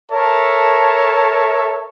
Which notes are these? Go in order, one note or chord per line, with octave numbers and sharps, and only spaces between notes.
A4 A#4 C#5 E5 A5